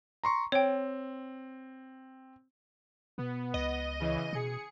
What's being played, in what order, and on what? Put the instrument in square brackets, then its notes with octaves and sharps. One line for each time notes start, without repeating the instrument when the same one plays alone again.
[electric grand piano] A#5 C6 C#6
[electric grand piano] C4 [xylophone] C#5 G5
[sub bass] B2 [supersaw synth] B3
[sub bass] C#2 [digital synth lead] D#5
[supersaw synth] C#3 E3
[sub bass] B2 [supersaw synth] G#4 C#7